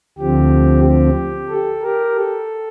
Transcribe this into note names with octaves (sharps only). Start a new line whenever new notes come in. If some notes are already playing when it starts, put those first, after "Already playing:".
D2 D3 F3 C4 G4
G4
A4
G4 A#4
A4